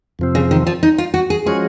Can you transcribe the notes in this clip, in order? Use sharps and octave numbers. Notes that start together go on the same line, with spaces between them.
F2 C3 F3 C4
C#3
D#3
F3
D#4
F4
F#4
G#4
F3 G#3 C#4 F#4 G#4